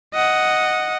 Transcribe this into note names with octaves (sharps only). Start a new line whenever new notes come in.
D#5 F#5